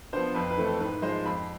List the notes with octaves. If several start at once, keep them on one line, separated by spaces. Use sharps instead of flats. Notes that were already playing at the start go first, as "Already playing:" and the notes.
F3 B3 D4 C5
F2 B4
B4
E3 A3 C4
A4
G#2 B4
F3 G#3 C5
F2 B5